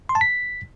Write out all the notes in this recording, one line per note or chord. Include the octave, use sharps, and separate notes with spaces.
C6
A5
B6